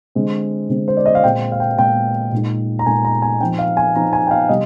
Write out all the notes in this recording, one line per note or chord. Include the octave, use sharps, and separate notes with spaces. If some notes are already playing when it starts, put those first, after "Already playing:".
D3 G#3 C4
D3 G#3 C4
C5
D5
D#5
F5
A#2 G#3 C4 G5
F5
G5
A#2 G#3 C4 G5
A#2 G#3 D#4
A#5
A#2 G#3 D#4 G#5
A#5
G#5
F3 C4 D#4 G5
F5
G#5
F3 C4 D#4 A#5
G#5
G5
F5
C3 G3 D#5